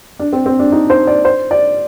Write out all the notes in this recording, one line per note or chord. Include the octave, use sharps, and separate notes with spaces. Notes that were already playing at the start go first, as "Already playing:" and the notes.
D4
C4
C4
D4
D#4
C5
D5
C5
D5